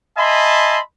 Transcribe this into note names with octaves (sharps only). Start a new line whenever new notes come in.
D#5 E5 G#5 A5 B5 C6